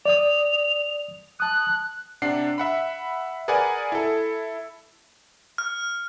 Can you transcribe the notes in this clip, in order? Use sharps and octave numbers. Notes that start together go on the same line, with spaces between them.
D5 D#6 F7
A5 D#6 F#6
C3 D4 F#5 C7
E5 F#5 B5
G#4 A#4 B4 D5 F#5 G#5
E4 A4
F6